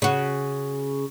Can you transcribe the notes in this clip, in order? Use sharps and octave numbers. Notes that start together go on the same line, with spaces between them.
C#3 F#4